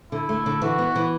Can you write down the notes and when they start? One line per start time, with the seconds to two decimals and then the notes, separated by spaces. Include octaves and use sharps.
0.12 D3 E4
0.29 A3
0.46 D3
0.62 E3 F#4
0.78 B3
0.96 E3